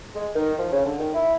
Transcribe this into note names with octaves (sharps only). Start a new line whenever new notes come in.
G#3
D#3
F3
C#3
D3
D#3
E4